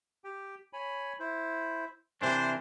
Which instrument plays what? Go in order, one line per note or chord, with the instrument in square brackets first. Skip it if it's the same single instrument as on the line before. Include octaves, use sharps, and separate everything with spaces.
[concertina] G4 G5
C#5 G#5 B5
E4 C5
[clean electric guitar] C3 E3 D4 [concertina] A#4 [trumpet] C5